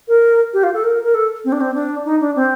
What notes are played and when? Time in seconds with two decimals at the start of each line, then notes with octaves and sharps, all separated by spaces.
0.08 A#4
0.54 G4
0.64 F4
0.74 A4
0.84 A#4
1.03 A#4
1.14 A4
1.45 C4
1.52 D4
1.61 C4
1.75 D4
2.05 D#4
2.20 D4
2.36 C4